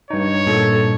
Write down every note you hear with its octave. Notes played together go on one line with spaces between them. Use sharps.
G2 D#4 C#5
A#2 A4